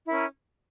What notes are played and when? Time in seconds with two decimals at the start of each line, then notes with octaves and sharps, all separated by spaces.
0.04 E4
0.07 A#4
0.11 C#4